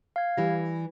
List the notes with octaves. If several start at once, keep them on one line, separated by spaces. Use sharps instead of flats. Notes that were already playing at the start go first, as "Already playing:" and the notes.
F5 G#6
E3 G3 A#6